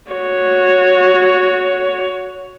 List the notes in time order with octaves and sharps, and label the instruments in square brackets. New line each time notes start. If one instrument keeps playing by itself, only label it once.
[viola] F#4 C#5